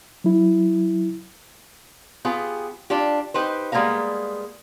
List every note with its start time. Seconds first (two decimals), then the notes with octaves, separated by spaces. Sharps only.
0.24 F#3 E4
2.25 B3 F4 G4 G#4
2.90 D4 F4 G4
3.34 D#4 G4 B4 C5
3.72 G3 G#3 A#3 B3 A#4 F5